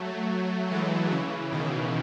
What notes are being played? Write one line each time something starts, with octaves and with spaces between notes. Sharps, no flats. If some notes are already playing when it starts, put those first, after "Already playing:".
Already playing: F#3 A3
E3 G#3
C#3 E3
B2 D#3